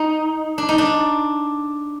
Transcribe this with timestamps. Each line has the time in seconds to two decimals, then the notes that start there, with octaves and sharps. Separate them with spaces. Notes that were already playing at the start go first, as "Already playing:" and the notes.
Already playing: D#4
0.58 D4
0.69 D#4
0.78 D4